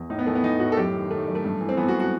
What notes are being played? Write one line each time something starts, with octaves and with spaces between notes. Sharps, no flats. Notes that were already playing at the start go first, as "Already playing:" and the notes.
Already playing: E2
A2 D#4
B3
E3 A3
B3
E3 D#4
A2 F#4
A4
F#2 G4
D#3
D#3 A3
F#2
A3
G2
E3
C4
E3 B3
F#4
F#4